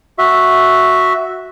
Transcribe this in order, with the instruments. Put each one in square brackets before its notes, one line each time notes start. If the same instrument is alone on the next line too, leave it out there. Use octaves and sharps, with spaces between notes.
[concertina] F#4 E5